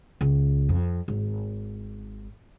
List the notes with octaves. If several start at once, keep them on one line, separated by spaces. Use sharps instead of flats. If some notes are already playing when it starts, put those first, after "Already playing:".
C#2
F2
G#1